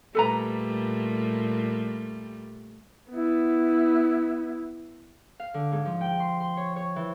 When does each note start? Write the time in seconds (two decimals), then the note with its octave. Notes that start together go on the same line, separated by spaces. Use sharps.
0.15 A#2 G3 A3 A4 B4 A#5
3.11 B3 E4
5.40 F5
5.54 D3
5.72 G#2
5.85 F3
6.01 G5
6.20 C6
6.40 C6
6.57 C#5
6.76 C#5
6.96 E3